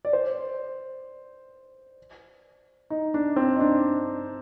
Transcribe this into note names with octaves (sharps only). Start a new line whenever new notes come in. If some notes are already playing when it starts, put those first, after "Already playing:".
D5
C5
D#4
D4
C4
D#4
D4